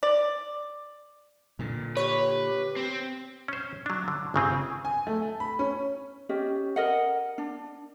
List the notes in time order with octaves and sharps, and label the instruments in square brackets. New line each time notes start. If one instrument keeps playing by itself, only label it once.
[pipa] D5
[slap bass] A#2 D3
[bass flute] G4 [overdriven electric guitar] B4 [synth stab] C#5
[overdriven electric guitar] C4
[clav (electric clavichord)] C#4 C5
F#3 D4
D3
G1 C#3 C4 G#4
[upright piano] G#5
A3
B5
C#4
[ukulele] C#4 G4 D#5
A#4 D#5 F#5
D4